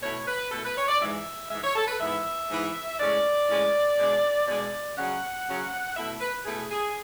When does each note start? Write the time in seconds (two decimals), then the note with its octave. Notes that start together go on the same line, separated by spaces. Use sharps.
0.02 B2 A3 E4 C#5
0.28 B4
0.52 B2 A3 E4 A4
0.65 B4
0.77 C#5
0.88 D5
1.01 G#2 E3 G#3 E5
1.50 G#2 E3 G#3 E5
1.64 C#5
1.76 A4
1.88 B4
2.00 G#2 E3 B3 E4 E5
2.50 G#2 E3 B3 E4
3.00 A2 G#3 C#4 D5
3.49 A2 G#3 C#4
3.99 B2 G#3 D4
4.47 B2 G#3 D4 D5
4.97 C#3 F#3 C#4 F#5
5.48 C#3 F#3 C#4
5.96 B2 A3 E4 E5
6.21 B4
6.45 B2 A3 E4 G#4
6.71 G#4